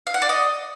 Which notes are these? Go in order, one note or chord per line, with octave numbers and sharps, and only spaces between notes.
F5
F#5
D5
D#5